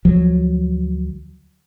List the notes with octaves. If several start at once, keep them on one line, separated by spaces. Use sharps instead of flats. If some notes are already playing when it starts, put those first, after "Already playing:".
D2 F3 F#3